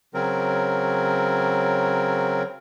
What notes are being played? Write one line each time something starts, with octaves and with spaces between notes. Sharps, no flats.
C#3 F#3 C4 A#4